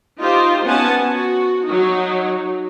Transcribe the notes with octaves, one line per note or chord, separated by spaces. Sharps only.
D#4 F4 G4 C5
B3 C#4 F#5 G#5 A5
F#4
F#3 D#4